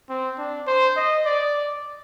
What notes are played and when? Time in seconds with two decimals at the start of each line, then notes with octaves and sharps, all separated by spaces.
0.09 C4
0.38 D4
0.67 C5
0.96 D#5
1.25 D5